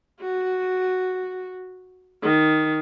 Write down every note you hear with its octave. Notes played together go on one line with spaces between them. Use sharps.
F#4
D#3